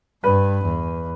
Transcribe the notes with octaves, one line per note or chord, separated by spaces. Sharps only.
G2 B4
E2